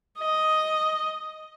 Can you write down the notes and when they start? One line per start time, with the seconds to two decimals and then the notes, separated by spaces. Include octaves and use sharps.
0.19 D#5